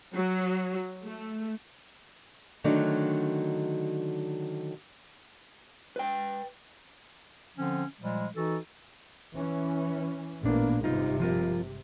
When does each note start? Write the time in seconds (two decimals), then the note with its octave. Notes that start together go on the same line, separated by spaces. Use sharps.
0.12 F#3
1.05 A3
2.64 D3 D#3 F#3 A3 D4
5.96 B4 G5
7.57 D3 F3 C4 C#4
8.01 A#2 F3 G3 G#3
8.35 E3 D#4 F#4 A4
9.35 E3 C#4
10.43 A1 A#2 A#3 B3 D4
10.84 G#1 G2 C3 D#4 F4
11.20 F3 F4 A#4